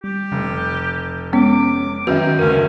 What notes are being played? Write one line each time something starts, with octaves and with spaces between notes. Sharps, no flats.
G3 G4
F1
G#3 B3 C#4 D6
F#2 D#3 F#4 B4 E5 G5
F#1 D2 C#4 A#4 D#7